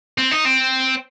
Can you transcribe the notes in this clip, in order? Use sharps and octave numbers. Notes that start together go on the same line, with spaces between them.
C4
D#4
C4